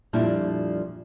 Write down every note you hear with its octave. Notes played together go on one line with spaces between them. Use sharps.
F2 A#2 F3 G3 D4 E4